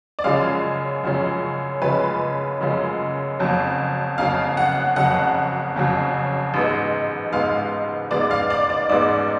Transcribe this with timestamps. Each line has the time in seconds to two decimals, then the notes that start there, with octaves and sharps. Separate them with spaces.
0.19 D5
0.24 F#2 C#3 F3 G#3 C#4 F5
1.03 F#2 C#3 F3 G#3 C#4
1.82 F#2 C#3 F3 G#3 C#4 B4
2.60 F#2 C#3 F3 G#3 C#4
3.39 F#1 F2 C#3 F#3
4.18 F#1 F2 C#3 F#3 F5
4.57 F#5
4.96 F#1 F2 C#3 F#3 F#5
5.75 F#1 F2 C#3 F#3
6.54 A1 G#2 G#3 B3
7.32 A1 G#2 G#3 B3 F5
8.11 A1 G#2 G#3 B3 D5
8.31 F5
8.50 D5
8.70 D5
8.90 A1 G#2 G#3 B3 D5